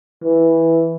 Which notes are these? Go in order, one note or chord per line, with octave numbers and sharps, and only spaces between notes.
E3